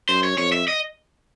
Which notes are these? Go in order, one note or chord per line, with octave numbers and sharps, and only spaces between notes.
F#2 C5
C#5
F2 C#5
E5
D#5